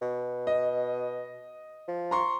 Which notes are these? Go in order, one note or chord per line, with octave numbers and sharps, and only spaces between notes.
B2
D#5
F3
A#5 C6 C#6